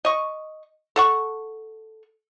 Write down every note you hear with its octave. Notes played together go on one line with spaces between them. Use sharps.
D#5 C#6
A4 F#5 C#6